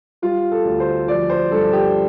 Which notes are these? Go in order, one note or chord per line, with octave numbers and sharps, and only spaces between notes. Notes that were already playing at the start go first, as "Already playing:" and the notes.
G3 F4
A4
D2
C5
F3 D5
C5
G2 A4
G4